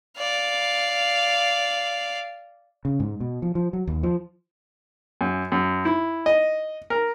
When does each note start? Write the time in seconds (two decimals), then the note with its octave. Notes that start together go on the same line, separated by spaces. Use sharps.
0.18 D5 F5
2.85 C#3
3.00 G#2
3.20 B2
3.42 F3
3.55 F3
3.73 F#3
3.87 D#2
4.03 F3
5.21 F#2
5.52 F#2
5.85 E4
6.26 D#5
6.90 A#4